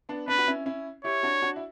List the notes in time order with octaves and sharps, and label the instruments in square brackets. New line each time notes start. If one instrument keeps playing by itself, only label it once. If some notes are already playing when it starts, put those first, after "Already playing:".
[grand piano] B3 D4
[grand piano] B3 D4 [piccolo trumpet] B4
[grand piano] F#4
C#4 E4
C#4 E4
[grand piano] E4 G4 [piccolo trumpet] C#5
[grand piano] D4 F#4
D4 F#4
E4